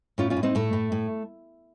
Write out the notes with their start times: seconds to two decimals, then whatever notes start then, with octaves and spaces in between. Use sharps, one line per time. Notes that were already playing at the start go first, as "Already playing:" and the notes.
0.18 A2 C#4 F4
0.30 C#4 F4
0.37 A2
0.43 C4 D#4
0.55 A2 A3
0.73 A2
0.92 A2